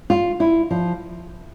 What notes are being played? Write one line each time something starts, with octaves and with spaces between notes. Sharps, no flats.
F4
E4
F3